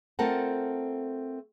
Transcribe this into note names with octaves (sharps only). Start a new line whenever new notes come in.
A3 C4 F4 A4 A#4 F#5